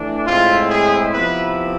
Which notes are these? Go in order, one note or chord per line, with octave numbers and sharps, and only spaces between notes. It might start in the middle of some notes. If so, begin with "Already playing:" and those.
Already playing: E3 A3 D4
A2 G#3 C4 E4 F4
G#4
C3 F3 B3 E4 B4